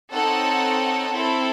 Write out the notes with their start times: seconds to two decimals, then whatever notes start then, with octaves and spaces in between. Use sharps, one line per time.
0.12 C4 D#4 A4 C#5 F#5
1.12 C4 E4 A4